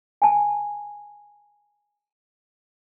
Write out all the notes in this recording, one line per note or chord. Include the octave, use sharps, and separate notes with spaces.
G#5 A5